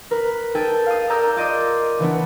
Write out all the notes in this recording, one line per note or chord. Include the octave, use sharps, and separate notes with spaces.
A#4 B4
D#4 G#4 A4 G5
F5 D#6
A#4 D5 A#5 D#6 E6 G6
F4 D5 D#5
C#3 E3 B3 D4